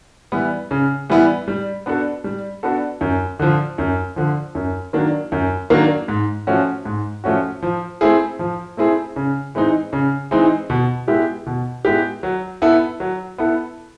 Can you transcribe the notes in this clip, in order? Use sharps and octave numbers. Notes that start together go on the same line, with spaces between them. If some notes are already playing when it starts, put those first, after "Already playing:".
E3 G3 B3 E4
C#3
E3 G3 B3 E4
G3
B3 D4 F#4 A4
G3
B3 D4 F#4 A4
F#2
D3 F3
F#2
D3 F3
F#2
D#3 F#3 A#3 D4
F#2
D#3 F#3 A#3 D4
G#2
F3 A3 C#4 F#4
G#2
F3 A3 C#4 F#4
F3
A3 C4 E4 G#4
F3
A3 C4 E4 G#4
C#3
E3 G#3 C4 D#4
C#3
E3 G#3 C4 D#4
B2
G#3 B3 E4 G4
B2
G#3 B3 E4 G4
F#3
B3 E4 A4
F#3
B3 E4 A4